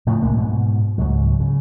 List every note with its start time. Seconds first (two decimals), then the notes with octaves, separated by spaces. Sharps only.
0.07 A2 C#3 F3
0.22 C2 G#3 A#3
0.37 G#2 B2
0.98 C#2 G#2 F#3
1.40 C#3